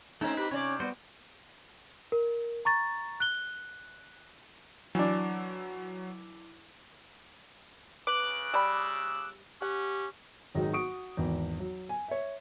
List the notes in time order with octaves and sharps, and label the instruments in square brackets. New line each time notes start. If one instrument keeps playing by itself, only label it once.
[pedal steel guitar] A3 C#4 [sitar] C4 D#4
[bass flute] G4 [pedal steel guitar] B4
[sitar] C3 D5 [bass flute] C#4 [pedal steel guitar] C#5
[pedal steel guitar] G3 F#4 C5 [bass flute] B3
[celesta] A#4
A#5 C#6 A6
F#6 G7
[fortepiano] E3 D4 [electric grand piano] F#3
[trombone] C#3 [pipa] B4 [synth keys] D6 F#6
[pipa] G3 B5 [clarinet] E6
[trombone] C#4 [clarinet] G4 [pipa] F#5
[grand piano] G#1 D#3 F#3 G#3 D#4 F#4
F#4 C#6 D#6 D7
G#1 E2
F#3
G#5
C#5 E5